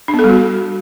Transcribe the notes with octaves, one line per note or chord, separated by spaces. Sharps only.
D4
B3
A4
G3
F#4